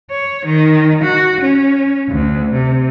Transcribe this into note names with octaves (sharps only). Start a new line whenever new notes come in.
C#5
D#3
F#4
C#4
D2
C3